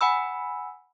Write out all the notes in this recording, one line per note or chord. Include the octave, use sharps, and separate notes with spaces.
F#5 G#5 B5 E6